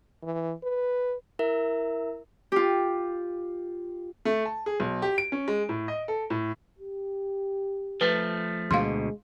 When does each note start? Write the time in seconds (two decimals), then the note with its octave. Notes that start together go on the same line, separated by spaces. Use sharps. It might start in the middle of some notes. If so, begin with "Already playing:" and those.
0.23 E3
0.63 B4
1.39 E4 A#4 E5
2.52 F4 G4
4.25 A3
4.45 A5
4.66 G#4
4.80 B1
5.02 G4
5.18 D7
5.32 C#4
5.48 G#3
5.69 A2
5.88 D#5
6.08 A4
6.30 A2
6.79 G4
8.01 F3 A3 B4
8.71 D2 B2 G#3 F5 C6